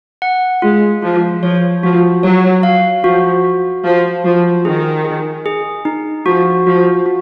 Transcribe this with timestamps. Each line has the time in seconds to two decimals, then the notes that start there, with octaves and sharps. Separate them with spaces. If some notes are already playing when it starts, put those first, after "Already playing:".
0.22 F#5
0.62 G#3 F4
1.02 F3 F4
1.42 F3 C#5
1.83 F3 F#4
2.23 F#3 C#5
2.63 F5
3.03 F3 F#4
3.44 F#4
3.84 F3 F5
4.24 F3 F#4
4.65 D#3 G#4
5.05 G#4
5.46 G#4
5.85 D#4
6.26 F3 F#4
6.66 F3 F#4
7.06 F#4